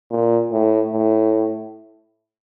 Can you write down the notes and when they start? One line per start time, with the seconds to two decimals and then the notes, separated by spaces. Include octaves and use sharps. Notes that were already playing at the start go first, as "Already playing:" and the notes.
0.11 A#2
0.52 A2
0.93 A2